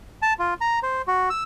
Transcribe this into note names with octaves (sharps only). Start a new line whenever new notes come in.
A5
F4
A#5
C5
F#4
E6